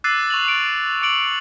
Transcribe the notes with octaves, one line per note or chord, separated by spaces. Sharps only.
D6 E6 F#6 A6 C7 D#7
C#6 F7 F#7
D7
D6 C#7 D7 F#7